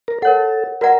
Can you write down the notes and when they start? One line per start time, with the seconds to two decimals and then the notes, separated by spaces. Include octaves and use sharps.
0.08 A#4
0.22 A4 A#4 C#5 F#5
0.81 F#4 A#4 B4 D5 F#5 A#5